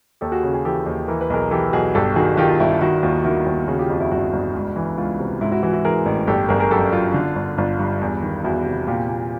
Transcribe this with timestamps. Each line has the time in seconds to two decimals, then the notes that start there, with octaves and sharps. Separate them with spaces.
0.21 D#2 G4 A4
0.32 F#4 G#4
0.43 C#3
0.53 F#4 G#4
0.65 E3 G4 A4
0.86 D#2
1.08 E3 A#4
1.21 B4
1.30 B1 G#4 A#4
1.51 E3 G4 A4
1.73 B1 F#4 G#4
1.95 G1 G4 A4
2.16 D#3 F#4 G#4
2.37 D#3 F4 G4
2.49 F4
2.60 G1 E4
2.71 F4
2.81 D#3 E4 F#4
3.03 D#2 F4
3.24 D#3 E4 F#4
3.46 D#2
3.67 C#3 F#4 G#4
3.78 F4 G4
3.90 F2 F4 G4
4.00 E4 F#4
4.11 G1 E4 F#4
4.33 G1
4.54 C#2
4.76 E3
4.98 C#2 F4
5.19 C3
5.41 G#2 E4
5.52 E4 F#4
5.63 E3 E4 F#4
5.73 E4 F#4
5.85 E3 G#4 A#4
6.06 A1
6.27 G1 G4 A4
6.49 G1 G#4 A#4
6.59 G#4 A#4
6.71 F#2 G4 A4
6.92 F#2 F4
7.14 D3
7.35 G1
7.58 G1 F4
7.79 G2
8.01 E2
8.22 D#3
8.44 E2 E4 F#4
8.66 C3
8.87 A#2 F4 G4
9.09 A#2